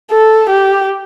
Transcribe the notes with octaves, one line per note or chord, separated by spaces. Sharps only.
A4
G4